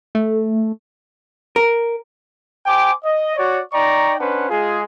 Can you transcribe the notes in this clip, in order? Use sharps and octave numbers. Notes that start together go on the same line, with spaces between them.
A3
A#4
C5 G5 G#5 D6
D#5
F#4 C#5 D5
D#4 D5 G5 A#5 C#6
C#4 D4 B4 C5 F#5
G#3 F4 G#4